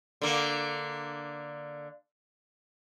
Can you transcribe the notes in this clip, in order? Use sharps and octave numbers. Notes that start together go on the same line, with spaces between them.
D3 A#3